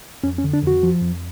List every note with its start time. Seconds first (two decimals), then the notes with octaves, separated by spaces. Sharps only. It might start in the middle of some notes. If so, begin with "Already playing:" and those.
0.23 F2 C#4
0.38 C#4
0.44 D3
0.53 D4
0.63 F2 F#4
0.83 F3
1.02 F2